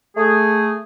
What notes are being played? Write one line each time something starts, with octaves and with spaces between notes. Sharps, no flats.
A3 G#4